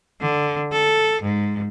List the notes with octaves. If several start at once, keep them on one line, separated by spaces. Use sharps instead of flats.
D3
A4
G#2